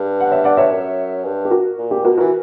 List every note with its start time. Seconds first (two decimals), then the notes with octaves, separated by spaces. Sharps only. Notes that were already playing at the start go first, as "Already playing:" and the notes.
Already playing: G2
0.20 F#5
0.31 C#5 E5
0.44 D5 F#5
0.57 C#5 E5
0.71 F#2
1.24 G2
1.45 G4
1.50 F#4 A#4
1.78 A#2
1.91 G4
2.04 B2 F#4 A#4
2.17 E3 F#4 A#4